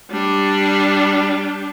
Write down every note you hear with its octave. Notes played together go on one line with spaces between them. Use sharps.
G3 D4